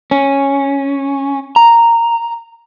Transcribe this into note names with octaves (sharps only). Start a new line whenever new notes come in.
C#4
A#5